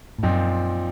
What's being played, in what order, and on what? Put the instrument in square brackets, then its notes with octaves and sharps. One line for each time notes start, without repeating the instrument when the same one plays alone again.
[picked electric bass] A2
[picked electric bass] F#2 [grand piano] A#2 F3 C4 D#4